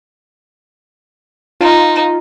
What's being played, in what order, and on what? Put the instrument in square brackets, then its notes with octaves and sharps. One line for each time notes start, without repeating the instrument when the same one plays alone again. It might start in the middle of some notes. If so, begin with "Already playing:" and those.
[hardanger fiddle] D#4 [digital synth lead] F4